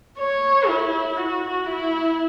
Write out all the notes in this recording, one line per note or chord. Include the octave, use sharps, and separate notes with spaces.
C#5
E4
F#4
E4